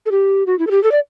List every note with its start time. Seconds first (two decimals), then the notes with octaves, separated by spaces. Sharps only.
0.06 A4
0.11 G4
0.47 F#4
0.59 E4
0.67 A4
0.71 G4
0.83 A4
0.92 D5